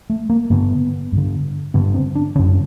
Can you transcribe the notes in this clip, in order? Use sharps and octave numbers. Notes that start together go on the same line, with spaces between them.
A3
A#3
G2 D3 B3
G2 D3
G2 D3 B3
C4
D4
F#2 D3 C#4